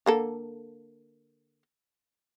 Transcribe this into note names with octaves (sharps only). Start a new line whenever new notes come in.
D3 A#3 A4